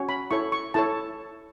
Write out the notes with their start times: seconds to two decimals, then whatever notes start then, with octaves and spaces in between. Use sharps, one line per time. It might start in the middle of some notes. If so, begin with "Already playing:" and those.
Already playing: C#4 F#4 C#5
0.09 B5
0.31 E4 A4 C#5 C#6
0.52 C#6
0.74 E4 A4 C#5 A5